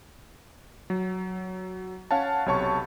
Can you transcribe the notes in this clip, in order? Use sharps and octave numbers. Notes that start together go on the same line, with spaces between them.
F#3
C#4 C#5 F5 F#5 A5
B1 C3 C#5 A5 C#6